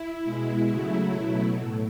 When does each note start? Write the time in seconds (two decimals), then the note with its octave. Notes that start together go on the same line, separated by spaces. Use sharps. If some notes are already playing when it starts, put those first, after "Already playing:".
Already playing: E4
0.24 B2 G#3
0.69 C#3 F#3 A3
1.15 B2 F#3 A3
1.60 A2